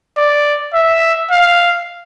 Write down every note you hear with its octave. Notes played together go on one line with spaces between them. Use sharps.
D5
E5
F5